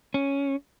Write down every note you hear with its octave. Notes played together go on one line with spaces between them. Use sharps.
C#4